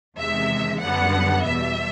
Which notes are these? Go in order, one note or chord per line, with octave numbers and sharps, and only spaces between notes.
E2 C3 D#3 G#3 E5
F#2 D3 G3 B3 F#5
E2 B2 G3 E5